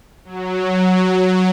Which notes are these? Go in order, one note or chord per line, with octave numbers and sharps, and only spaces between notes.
F#3